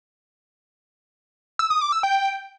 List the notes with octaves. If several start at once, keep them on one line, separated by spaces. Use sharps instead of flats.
E6
D#6
D6
E6
G5